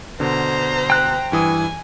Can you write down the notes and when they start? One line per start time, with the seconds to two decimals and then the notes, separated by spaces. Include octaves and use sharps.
0.20 B2 D3 C5 A#5
0.90 G5 F#6
1.32 G2 E3 G#5 D#6